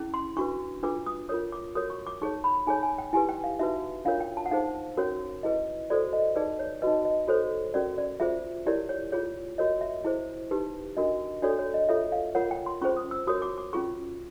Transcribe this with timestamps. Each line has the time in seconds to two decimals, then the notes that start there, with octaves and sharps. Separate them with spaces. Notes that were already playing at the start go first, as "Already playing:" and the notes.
Already playing: C#4 E4 G#4
0.14 C6
0.37 D4 F#4 B4 C#6
0.83 D4 F4 G#4 B4 D6
1.06 D#6
1.29 F4 A#4 C#5 D#6
1.52 D6
1.75 F#4 A#4 C#5 D#6
1.90 C#6
2.07 D6
2.22 D#4 G#4 C#5 C#6
2.44 B5
2.67 D#4 G#4 C#5 G#5
2.83 G#5
2.98 G5
3.13 E4 G4 B4 G#5
3.29 G5
3.44 F5
3.59 D#4 F#4 B4 E5
4.05 D4 F4 A#4 C#5 F5
4.20 G5
4.37 A5
4.46 F#5
4.51 D#4 G#4 C5 F5
4.97 C#4 F#4 A#4 C#5
5.43 E4 G#4 B4 D#5
5.90 F#4 A4 C5 D5
6.13 D#5
6.36 D#4 G#4 B4 D5
6.59 C#5
6.82 D#4 F#4 B4 D#5
7.05 D#5
7.28 F#4 A4 C5 C#5
7.74 C#4 F#4 A#4 D5
7.98 D5
8.20 F4 G#4 C5 E5
8.66 E4 G4 A#4 C#5 D5
8.89 C#5
9.12 F4 G#4 C#5
9.58 F#4 A#4 C#5 D#5
9.81 E5
10.05 E4 G#4 C5
10.51 D#4 G4 B4
10.97 D4 F#4 A#4 D#5
11.42 D4 F#4 A4 C#5 D5
11.59 C#5
11.74 D#5
11.89 F4 A4 C#5 E5
12.12 F5
12.35 F4 A#4 C#5 F#5
12.51 G5
12.66 C6
12.81 C#4 F4 G#4 C5 C#6
12.97 D#6
13.11 E6
13.27 F#4 A#4 C#5 D#6
13.42 D6
13.58 D6
13.73 C#4 F4 G#4 C#6